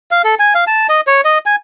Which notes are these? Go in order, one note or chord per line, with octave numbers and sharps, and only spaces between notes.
F5
A4
G#5
F5
A5
D#5
C#5
D#5
G#5